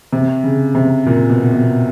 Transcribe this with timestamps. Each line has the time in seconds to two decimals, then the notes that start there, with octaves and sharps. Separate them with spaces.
0.13 C3
0.44 C#3
0.75 C3
1.06 A#2
1.30 B2
1.53 B2